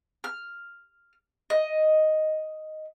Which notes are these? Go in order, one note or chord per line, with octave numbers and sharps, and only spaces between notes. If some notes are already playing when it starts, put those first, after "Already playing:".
F6
D#5